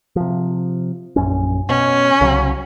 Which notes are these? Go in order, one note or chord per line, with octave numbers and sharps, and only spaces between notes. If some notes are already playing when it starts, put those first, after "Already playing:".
C3 F3
A#1 F#2 C#4
B2 C#4
C2 C#3 F#3